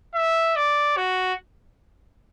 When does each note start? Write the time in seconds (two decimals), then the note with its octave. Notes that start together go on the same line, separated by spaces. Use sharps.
0.15 E5
0.56 D5
0.97 F#4